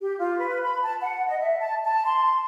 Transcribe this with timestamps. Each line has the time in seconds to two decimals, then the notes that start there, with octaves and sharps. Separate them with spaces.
0.01 G4
0.19 F4
0.39 B4
0.63 B5
0.82 A5
1.01 F#5
1.27 D#5
1.39 E5
1.60 A5
1.85 A5
2.05 C6
2.25 C6